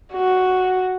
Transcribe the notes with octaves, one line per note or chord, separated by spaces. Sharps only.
F#4